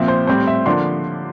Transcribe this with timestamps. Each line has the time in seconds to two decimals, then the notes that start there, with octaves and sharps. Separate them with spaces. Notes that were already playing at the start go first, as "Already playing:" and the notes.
Already playing: A#2 F3 C4 E5
0.08 C5
0.27 A2 G3 C4 C5
0.47 E5
0.66 D3 F3 A#3 D4 C6